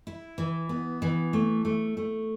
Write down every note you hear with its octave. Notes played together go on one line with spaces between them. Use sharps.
E4
E3
B3
E3
A3
A3
A3